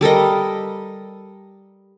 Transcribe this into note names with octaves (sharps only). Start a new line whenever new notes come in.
G3 A4 A#4 D#5